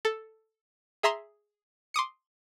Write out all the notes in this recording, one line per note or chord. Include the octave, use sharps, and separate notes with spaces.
A4
G#4 E5 A#5 C6
C6 D6 D#6 C#7